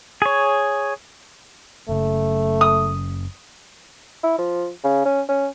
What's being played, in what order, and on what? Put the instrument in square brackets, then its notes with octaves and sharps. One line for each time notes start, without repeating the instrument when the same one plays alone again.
[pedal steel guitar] G#4 C#5
[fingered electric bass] F#1 C#3 [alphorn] A3
[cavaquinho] D#6
[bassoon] E4
F3
C#3
C#4
C#4